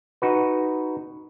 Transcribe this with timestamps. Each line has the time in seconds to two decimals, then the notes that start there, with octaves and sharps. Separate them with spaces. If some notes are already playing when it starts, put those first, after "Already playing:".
0.22 D#4 F#4 B4